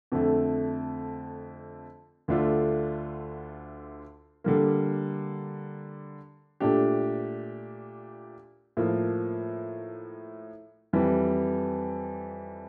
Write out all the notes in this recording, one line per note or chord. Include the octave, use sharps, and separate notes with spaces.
F2 D3 A3
D2 D3 A3 D4 F4
D3 G3 A#3
A#2 A3 D4 G4
A2 F3 A#3
F2 E3 G3